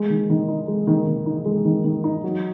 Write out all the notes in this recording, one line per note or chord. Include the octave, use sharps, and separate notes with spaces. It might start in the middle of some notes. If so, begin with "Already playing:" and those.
Already playing: G#3
D#3
D#3
D#4
G#3
D#3
D#3
D#4
G#3
D#3
D#3
D#4
F#3